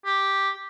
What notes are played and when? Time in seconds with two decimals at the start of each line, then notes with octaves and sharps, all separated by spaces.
0.05 G4